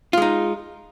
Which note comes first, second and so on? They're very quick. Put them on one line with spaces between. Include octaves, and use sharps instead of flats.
F4 G#3 D#4